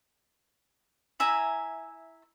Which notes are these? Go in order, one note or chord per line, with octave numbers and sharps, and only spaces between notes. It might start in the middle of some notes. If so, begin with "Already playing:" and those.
E4 E5 G#5 A#5